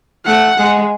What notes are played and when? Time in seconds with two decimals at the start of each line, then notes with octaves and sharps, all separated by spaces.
0.25 A3 F#5
0.57 G#3